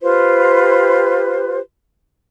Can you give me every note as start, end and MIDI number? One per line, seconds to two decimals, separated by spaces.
0.01 1.58 65
0.01 1.58 67
0.01 1.58 71
0.01 1.58 72